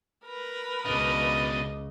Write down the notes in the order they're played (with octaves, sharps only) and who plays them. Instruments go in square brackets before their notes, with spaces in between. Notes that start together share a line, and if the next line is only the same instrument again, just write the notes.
[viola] A#4 B4
[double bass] C#2 [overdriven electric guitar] B2 D4 [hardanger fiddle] D#5